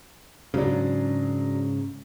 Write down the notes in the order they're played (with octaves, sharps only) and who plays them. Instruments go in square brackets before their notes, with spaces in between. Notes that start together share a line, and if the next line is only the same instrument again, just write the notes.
[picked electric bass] G#2 C#3 [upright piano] F#3 D4